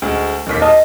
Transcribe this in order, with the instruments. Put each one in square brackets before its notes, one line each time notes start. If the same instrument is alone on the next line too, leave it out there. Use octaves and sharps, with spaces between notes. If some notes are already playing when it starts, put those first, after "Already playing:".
[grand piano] D2 G#3
D1 D#2 B6
[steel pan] D#5 [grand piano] A5